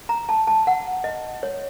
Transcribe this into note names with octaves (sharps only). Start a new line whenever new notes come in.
A#5
A5
A5
F#5
D#5
C#5